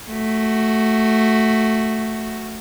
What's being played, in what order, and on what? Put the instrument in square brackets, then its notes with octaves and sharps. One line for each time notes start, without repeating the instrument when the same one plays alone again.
[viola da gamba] A3 F#4